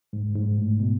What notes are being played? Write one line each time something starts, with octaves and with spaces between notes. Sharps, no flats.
G#2
G#2
A2
B2